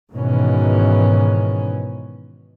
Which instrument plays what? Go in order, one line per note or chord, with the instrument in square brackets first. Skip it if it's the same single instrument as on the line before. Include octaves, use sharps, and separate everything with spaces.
[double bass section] G#2 B2 D#3 E3 C#4